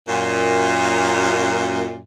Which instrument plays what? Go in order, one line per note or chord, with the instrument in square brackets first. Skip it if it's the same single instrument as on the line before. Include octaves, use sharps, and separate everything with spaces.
[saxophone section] F#2 A#2